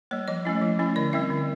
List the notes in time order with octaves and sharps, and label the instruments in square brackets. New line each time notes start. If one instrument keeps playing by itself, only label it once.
[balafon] G3 A#3 C#5
F3 D#5
A3 C#4 E4
F3
A3 C#4 E4
D3 D5
G3 C4 E4 E5
D3